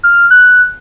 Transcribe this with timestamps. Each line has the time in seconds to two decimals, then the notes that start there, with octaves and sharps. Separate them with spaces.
0.03 F6
0.31 F#6